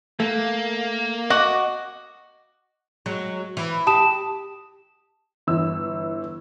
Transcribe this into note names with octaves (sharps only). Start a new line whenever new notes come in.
A3 A#3
F#4 D#5 C#6 D6
F#3 G#3
E3
G4 A5 D#6 E7
G1 E3 E6